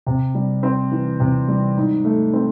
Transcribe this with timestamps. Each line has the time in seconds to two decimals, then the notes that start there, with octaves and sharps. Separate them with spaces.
0.06 C3
0.35 G3
0.63 C4
0.92 E3
1.20 C3
1.48 G3
1.76 G#2
2.05 A3
2.33 C4